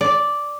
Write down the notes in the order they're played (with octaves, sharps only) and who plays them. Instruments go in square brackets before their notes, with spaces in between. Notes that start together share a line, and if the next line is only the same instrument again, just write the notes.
[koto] D5